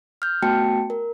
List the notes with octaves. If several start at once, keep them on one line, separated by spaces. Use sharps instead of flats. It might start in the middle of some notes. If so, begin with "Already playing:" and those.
F6 G6
A3 B3 F#4 G5 A5 C#7
A#4